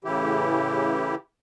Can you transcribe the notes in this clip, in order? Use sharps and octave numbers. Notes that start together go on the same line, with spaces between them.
A2 C#3 E3 E4 G4